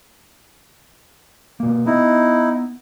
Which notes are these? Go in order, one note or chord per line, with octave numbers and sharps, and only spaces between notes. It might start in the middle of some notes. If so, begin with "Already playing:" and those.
B2 A#3
B3 D#4 E4